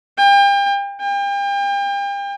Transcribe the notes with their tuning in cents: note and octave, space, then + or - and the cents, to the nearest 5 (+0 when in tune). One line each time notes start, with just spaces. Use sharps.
G5 +35
G5 +35